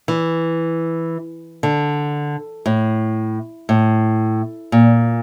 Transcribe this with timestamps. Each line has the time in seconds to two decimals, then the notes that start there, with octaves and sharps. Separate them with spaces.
0.08 E3
1.63 D3
2.66 A2
3.69 A2
4.72 A#2